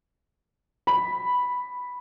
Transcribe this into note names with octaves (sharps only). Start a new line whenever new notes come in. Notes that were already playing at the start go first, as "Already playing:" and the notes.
B5